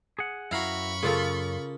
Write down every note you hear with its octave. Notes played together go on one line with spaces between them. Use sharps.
G#4 F#5
F#2 E4 F#4 F5 A#5 B5 C#6
C#3 A#3 F4 A4